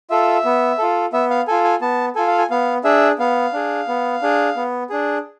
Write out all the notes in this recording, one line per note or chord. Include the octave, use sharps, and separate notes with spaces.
F4 A4 E5
B3
F4 A4
B3 E5
F5
F4 A4 G#5
G#5
B3 A5
F4 A4 G#5
F5
G#5
B3 F5
D4 G#4 E5
B3 F5
D4 G#4
B3
D4 G#4
B3
D4 G#4